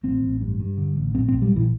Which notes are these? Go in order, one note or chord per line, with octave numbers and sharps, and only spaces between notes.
A1 C4
A1
G2
G2
D3
A1
A#1 C4
C4
A#1
G3
A#1 E3